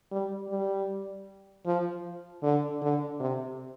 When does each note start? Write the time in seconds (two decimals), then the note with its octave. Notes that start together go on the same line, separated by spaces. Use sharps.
0.12 G3
0.49 G3
1.66 F3
2.43 D3
2.82 D3
3.20 C3